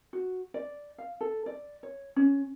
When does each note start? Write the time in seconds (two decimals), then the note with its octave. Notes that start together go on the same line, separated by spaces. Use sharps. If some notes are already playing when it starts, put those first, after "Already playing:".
0.13 F#4
0.54 D5
0.98 F5
1.21 A4
1.46 D5
1.83 C#5
2.16 C#4